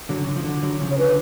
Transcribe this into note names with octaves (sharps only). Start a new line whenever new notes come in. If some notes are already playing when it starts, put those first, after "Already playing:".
D3 F#3
C#3
D3
F3
D3
D3 F#3
C#3 F3
C#5
D3 B4